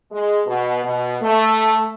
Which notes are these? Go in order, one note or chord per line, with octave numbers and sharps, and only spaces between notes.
G#3
B2
B2
A3